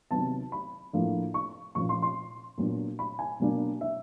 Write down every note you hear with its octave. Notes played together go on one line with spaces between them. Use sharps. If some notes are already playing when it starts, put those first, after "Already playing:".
C3 D#3 F#3 B3 A5
B5
A2 F3 A#3 D4
C#6
A#2 F3 A#3 C#4 C#6
C6
C6
A#2 F#3 B3 D4
B5
G#5
B2 F#3 A#3 D4
E5